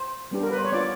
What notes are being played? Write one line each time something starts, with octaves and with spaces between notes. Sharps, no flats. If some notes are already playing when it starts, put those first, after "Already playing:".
Already playing: C5
G3 B3 D4 G4
A#4
B4
C5
C#5
B3 D4 F4 D5